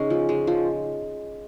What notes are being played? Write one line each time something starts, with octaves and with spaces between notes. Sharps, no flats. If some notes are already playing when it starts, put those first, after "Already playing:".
Already playing: C#3 G#3 C#4 D#4
F3
G#3
F3